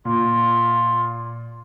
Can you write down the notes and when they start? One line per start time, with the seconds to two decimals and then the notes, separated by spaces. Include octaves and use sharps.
0.05 A#2 F4